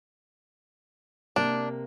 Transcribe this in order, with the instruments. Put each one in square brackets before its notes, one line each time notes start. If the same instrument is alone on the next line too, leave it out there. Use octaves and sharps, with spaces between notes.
[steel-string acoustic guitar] C3 A#3 [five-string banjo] D4